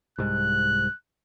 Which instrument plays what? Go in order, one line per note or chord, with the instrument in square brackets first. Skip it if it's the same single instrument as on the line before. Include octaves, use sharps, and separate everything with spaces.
[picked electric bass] C2 G#2 [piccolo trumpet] F#6